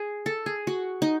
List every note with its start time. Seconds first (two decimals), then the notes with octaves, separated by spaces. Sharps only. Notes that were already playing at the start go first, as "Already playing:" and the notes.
Already playing: G#4
0.26 A4
0.46 G#4
0.67 F#4
1.02 D#4